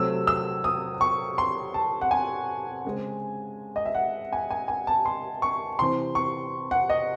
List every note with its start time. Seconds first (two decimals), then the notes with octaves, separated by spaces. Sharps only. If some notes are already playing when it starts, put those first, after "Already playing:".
Already playing: C3 F#3 A3 C4 E6
0.27 E6
0.64 D#6
1.01 C#6
1.38 C6
1.74 A5
2.01 F#5
2.11 G#5
2.85 C#3 G#3 C4
3.76 D#5
3.85 E5
3.95 F#5
4.32 G#5
4.50 G#5
4.68 G#5
4.87 A5
5.06 C6
5.42 C#6
5.79 C3 E3 C4 C6
6.15 C#6
6.71 F#5
6.90 D#5